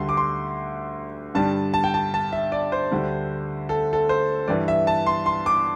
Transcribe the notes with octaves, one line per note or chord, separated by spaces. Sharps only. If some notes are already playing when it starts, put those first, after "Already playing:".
Already playing: D2 D3 G3 C6
D6
C6
G2 D3 G3 A5
A5
G5
A5
A5
E5
D5
C5
D2 D3 G3
A4
A4
C5
G2 E3 G3 D5
E5
A5
C6
C6
D6